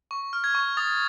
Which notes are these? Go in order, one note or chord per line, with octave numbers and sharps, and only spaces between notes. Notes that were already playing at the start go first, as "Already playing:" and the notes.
C#6
F6
G#6
C#6
D#6 A6